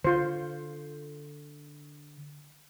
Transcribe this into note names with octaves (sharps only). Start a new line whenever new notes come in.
D3 F4 C5